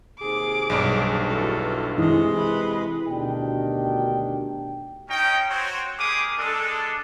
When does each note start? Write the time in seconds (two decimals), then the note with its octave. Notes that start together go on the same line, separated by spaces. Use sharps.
0.20 D#2 C3 G#4 D6
0.70 B1 G2
1.28 D2 E3 F4 A4
1.98 C3 E3 G#3
2.36 B4
3.07 D2 B2 D#3 D4 G4 G5
5.09 C#4 D#4 G5
5.49 C4 F#4 C5 C#5
5.98 G#3 A#3 G4 G#4 D6 D#6
6.38 G#3 D4 A4